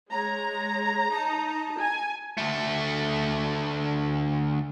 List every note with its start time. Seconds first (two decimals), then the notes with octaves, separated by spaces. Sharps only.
0.12 G#3 C#5 A#5
1.11 D#4 A5
1.80 G#5
2.38 D2 A3